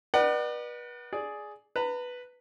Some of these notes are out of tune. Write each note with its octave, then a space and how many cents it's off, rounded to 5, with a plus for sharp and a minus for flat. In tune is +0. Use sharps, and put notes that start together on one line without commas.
B4 -30 D5 +40 F#5 +30
G#4 +10 D5 +0
B4 +0 A#5 -40